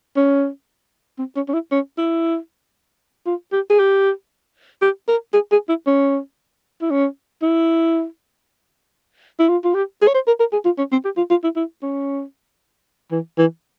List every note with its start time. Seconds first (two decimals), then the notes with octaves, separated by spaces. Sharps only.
0.16 C#4
1.19 C4
1.36 C#4
1.48 C#4
1.54 E4
1.72 C#4
1.98 E4
3.27 F4
3.52 G4
3.70 G#4
3.79 G4
4.82 G4
5.08 A#4
5.34 G#4
5.52 G#4
5.69 E4
5.87 C#4
6.82 E4
6.90 C#4
7.42 E4
9.39 E4
9.49 F4
9.65 F4
9.75 G4
10.02 G#4
10.08 C#5
10.14 C5
10.28 A#4
10.40 A#4
10.53 G#4
10.65 F4
10.78 C#4
10.92 C4
11.05 G4
11.17 F4
11.30 F4
11.44 E4
11.56 E4
11.83 C#4
13.12 E3
13.38 E3